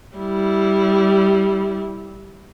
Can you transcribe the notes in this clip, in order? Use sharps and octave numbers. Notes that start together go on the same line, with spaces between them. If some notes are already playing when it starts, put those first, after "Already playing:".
G3 E4